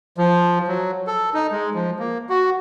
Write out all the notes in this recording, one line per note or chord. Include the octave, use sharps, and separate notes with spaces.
F3
F#3
A4
D#4
G#3
F3
A#3
F#4